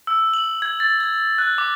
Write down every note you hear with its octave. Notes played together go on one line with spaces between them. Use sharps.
E6
F#7
G#6
A6
G#6
F#6
D6